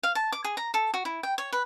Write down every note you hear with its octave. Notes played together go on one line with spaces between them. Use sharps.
F5
A5
D6
G#4
A#5
A4
F#4
E4
G5
C#5
B4